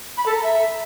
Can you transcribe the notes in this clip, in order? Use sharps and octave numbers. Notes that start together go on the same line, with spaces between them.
B5
A4
A#5
E5